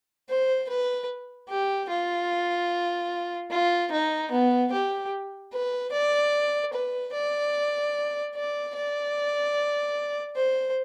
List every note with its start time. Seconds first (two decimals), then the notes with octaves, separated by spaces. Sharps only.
0.29 C5
0.69 B4
1.49 G4
1.89 F4
3.50 F4
3.92 D#4
4.31 B3
4.72 G4
5.53 B4
5.92 D5
6.73 B4
7.13 D5
8.35 D5
8.75 D5
10.36 C5